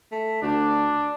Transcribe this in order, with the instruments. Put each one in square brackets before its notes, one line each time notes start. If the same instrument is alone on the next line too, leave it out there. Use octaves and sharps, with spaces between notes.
[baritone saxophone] A3
[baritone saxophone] D2 [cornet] D4